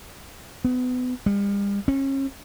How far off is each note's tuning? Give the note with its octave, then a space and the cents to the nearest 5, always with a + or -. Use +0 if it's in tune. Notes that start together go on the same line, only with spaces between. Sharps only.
B3 +30
G3 +40
C#4 -35